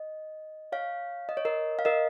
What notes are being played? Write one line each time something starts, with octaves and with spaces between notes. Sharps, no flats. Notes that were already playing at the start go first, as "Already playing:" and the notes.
Already playing: D#5
C#5 F5
D#5
C#5
A#4 D#5
F5
A#4 D#5